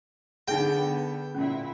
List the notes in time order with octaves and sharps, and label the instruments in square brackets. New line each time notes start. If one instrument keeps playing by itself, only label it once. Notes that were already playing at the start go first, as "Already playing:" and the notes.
[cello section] D3 B3 [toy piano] D#4 G#4 [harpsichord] G5
[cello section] A#2 E4 [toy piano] C#4